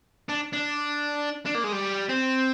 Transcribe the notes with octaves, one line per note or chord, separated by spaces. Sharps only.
D4
D4
D4
A#3
G#3
G3
C4